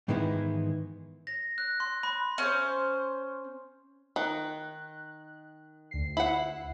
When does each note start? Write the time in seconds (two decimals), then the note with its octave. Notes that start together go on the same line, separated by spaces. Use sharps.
0.08 G#2 D#3 E3 G#3 B3 E4
1.27 A#6
1.58 F#6
1.80 C6
2.03 B5
2.38 C#4 C5
4.16 D#3 F#6
5.91 D2 C7
6.17 E4 F#5